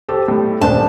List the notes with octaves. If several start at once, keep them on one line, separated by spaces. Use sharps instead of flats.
G4 A4 C5
A2 G3
D#1 D4 C5 A5